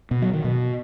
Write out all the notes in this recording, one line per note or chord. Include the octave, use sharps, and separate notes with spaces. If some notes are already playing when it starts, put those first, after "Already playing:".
B2
F#3
D#3
B2